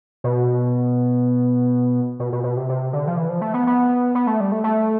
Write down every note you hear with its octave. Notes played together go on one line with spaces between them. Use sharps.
B2
B2
B2
B2
C3
C3
D3
F3
E3
F3
A3
B3
B3
B3
A3
G3
A3
A3